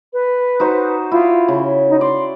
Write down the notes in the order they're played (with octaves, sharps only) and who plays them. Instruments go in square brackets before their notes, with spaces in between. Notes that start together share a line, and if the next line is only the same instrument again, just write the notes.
[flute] B4
[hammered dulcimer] D#4 F#4 C5
[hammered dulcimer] E4 [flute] F4
[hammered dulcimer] C#3
[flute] D#4
[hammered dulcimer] D5 [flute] C6